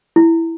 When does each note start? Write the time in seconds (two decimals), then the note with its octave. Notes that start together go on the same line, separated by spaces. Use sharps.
0.16 E4